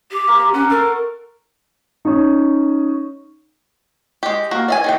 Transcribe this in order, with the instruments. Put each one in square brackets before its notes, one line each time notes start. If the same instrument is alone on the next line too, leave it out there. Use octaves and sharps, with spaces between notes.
[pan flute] G4
[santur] A#3 C5
[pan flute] C#4 [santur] F#5
[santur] A4 F5 C#6 [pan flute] A#4
[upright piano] C#4 D#4
[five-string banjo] G#3 G4
A#3 F#4 A#4
D5 E5 G#5
D#3 E3 G5